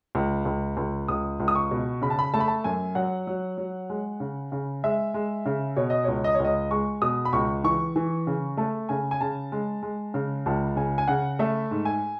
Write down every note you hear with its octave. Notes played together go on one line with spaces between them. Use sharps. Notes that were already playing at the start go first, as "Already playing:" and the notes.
C#2
C#2
C#2
C#2 D#6
C#2
D#6
C#6
B2
C#3 B5
A5
B5
A3 A5
B5
A5
F#2 G#5
F#3 F#5
F#3
F#3
G#3
C#3
C#3
G#3 E5
G#3
C#3
B2 C#5
D#5
C#2 C#5
D#5
C#5
C#2 D#5
G#3 C#6
B2 D#6
B5
C#2 C#6
E3 C#6
E3
C#3
A3 A5
C#3 G#5
G#5
C#3 A5
G#3
G#3
C#3
C#2 A5
C#3 G#5
G#5
C#3 F#5
A3 E5
G#2
G#5